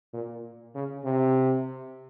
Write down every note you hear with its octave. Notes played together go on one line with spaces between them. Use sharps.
A#2
C#3
C3